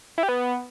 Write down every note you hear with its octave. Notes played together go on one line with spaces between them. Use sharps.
E4
G4
B3